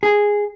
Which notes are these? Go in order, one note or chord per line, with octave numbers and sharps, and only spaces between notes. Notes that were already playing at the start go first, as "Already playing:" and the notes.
G#4